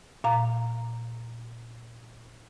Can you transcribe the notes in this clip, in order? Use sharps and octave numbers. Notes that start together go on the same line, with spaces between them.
A#2 F5 A#5